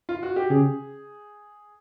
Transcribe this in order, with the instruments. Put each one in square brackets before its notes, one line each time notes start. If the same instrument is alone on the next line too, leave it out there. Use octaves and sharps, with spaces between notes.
[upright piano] F4
F#4
G4
[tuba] C#3 [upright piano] G#4